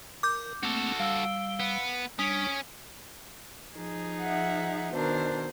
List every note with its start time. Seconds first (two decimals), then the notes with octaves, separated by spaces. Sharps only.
0.23 A#4 D6 G6
0.63 A3 A#3 C4 F#4 A4
1.00 G3 F5 E6
1.60 B3
2.19 G3 C#4 D4 D#6 B6 D7
3.76 F3 D#4 G#4
4.20 E5 F#5
4.94 B2 D#3 D4 A#4 C5